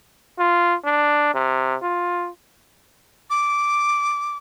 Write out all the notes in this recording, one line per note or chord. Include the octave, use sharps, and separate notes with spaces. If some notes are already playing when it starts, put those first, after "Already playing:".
F4
D4
C3
F4
D6